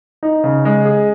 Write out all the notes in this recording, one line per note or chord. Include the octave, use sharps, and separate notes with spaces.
D#4
C#3
G#3
G#4